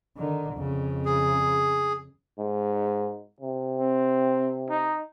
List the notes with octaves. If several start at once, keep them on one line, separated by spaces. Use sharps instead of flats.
D3 D#3
F2 C#3
G#4
G#2
C3
C4
D#4